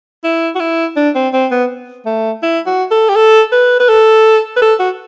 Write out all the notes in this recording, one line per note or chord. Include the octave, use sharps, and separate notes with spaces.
E4
F#4
E4
D4
C4
C4
B3
A3
E4
F#4
A4
G4
A4
B4
B4
A4
B4
A4
F#4